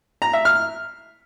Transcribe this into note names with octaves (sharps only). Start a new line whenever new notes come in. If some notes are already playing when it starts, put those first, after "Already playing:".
A#5
E5
F6